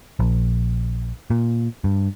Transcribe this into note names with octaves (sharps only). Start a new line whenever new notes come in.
A#1
A#2
G2